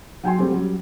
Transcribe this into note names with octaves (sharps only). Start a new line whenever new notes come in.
F#3 G5 G#5 C6
G3 A3 C4
F#3 G3 C#4